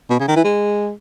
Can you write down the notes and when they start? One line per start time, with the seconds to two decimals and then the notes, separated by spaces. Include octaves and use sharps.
0.10 B2
0.20 C#3
0.28 D#3
0.36 E3
0.44 G#3